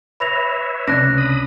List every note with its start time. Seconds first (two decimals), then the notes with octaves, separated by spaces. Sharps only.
0.20 B4 C#5 E5 B5 A#6 F7
0.88 C#2 C3 C#4 D4 F#6 A#6
1.18 B5 D#6